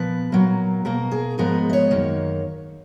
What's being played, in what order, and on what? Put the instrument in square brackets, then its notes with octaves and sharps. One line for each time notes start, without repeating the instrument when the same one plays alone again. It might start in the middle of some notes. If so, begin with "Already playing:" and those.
Already playing: [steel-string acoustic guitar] A#2 F3 B3 B4
A#2 F#3 A#3
B2 A#3 A#4
G#4
G#2 F3 G#3 B3 A#4
D#5
C#5
F#2 D#3 A#3